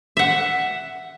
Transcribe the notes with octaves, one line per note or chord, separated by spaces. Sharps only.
E5 F#5